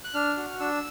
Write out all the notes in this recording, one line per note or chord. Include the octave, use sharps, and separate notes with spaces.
F#6
D4 F6
F#4
D4 E6